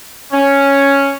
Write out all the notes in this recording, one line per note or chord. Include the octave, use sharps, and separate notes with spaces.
C#4